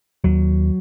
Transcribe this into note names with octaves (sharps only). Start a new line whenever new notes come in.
D#2 F#3